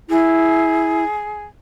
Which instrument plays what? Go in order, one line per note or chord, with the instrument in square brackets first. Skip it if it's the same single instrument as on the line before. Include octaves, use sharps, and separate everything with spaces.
[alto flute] E4 [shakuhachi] G#4